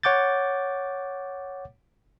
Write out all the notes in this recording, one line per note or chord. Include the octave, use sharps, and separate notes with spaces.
C#5 F#5 D6 G6 A6